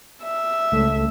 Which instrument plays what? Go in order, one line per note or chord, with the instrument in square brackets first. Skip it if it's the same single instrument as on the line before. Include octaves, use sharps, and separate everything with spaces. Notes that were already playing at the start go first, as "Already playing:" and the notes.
[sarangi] E5
[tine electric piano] C#2 A3